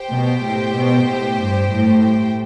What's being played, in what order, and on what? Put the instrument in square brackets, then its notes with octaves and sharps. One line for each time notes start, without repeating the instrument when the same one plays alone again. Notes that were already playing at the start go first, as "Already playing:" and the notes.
Already playing: [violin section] G4 C5 G5
[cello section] B2
A2
B2
A2
G2
A2